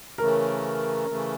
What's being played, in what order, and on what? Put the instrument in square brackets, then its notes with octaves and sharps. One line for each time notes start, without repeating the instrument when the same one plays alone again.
[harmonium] C#3 E3 A3 C#4 [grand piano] A#4
[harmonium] C#3 E3 A3 C#4